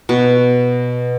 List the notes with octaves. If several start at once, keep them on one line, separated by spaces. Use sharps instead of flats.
B2